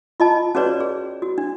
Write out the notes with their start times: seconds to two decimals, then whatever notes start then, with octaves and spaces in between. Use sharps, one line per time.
0.20 F4 D#5 A5
0.55 C#4 F#4 G#4 B4 C#5 D5
0.80 G#4
1.22 F#4
1.38 D4